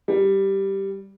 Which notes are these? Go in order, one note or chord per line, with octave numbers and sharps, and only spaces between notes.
G3